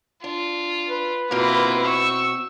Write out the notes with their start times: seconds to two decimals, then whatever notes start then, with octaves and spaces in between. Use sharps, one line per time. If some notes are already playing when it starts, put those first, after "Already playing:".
0.24 D4 F4
0.89 B4
1.31 B2 A#3 C4 E4 F4
1.87 C#6 E6